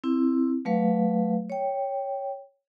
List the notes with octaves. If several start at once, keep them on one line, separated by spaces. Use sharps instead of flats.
C4 E4
F#3 A3 B4 F5
C#5 G5